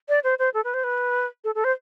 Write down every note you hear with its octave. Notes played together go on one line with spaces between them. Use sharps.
D5
C5
C5
A4
B4
C5
B4
A4
A4
C5